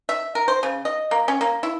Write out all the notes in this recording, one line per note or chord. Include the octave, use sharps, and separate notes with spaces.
E5
A#4
C5
C#3
D#5
A#3
C#4
A#3
E4